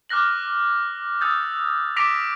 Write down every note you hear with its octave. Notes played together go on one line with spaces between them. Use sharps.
D6 F6 F#6 A#6 F#7
D#6 E6 G6 A6
D6 A#6 B6 D7 F7